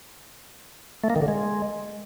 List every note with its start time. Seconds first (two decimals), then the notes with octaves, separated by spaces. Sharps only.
1.04 A3
1.10 A#3
1.16 D#3
1.22 D3
1.28 G#3